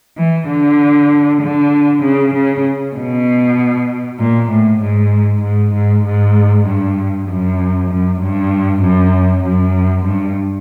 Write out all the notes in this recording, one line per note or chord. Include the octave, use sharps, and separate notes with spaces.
E3
D3
D3
C#3
C#3
B2
A#2
A2
G#2
G#2
G#2
G#2
G2
F#2
F#2
G2
F#2
F#2
G2